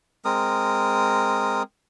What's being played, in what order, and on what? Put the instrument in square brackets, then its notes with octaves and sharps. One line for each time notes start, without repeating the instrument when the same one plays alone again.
[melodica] G#3 C4 A#4 D#6